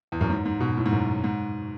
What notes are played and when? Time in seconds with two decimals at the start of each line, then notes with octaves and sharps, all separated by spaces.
0.12 E2
0.21 F#2
0.30 G#2
0.46 G#2
0.60 B2
0.77 A2
0.86 G#2
0.92 F#2
1.24 G#2